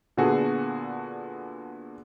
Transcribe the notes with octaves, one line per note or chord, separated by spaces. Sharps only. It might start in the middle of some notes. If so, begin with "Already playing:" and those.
A#2 D3 B3 F#4 G#4 A4